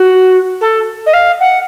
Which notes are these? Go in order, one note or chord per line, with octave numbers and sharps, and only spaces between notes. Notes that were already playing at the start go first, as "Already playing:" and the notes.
Already playing: F#4
A4
D#5
F5
F#5